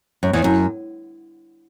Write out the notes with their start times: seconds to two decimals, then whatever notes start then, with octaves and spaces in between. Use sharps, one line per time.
0.23 F#2
0.33 E2
0.44 F#2